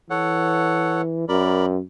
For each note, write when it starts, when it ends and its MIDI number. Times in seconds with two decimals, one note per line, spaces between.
0.10 1.25 52
0.10 1.01 69
0.10 1.01 73
0.10 1.01 78
1.28 1.80 42
1.28 1.66 70
1.28 1.66 74
1.28 1.66 83